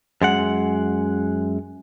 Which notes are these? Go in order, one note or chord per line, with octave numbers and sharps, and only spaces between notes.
F#2 G#3 F#5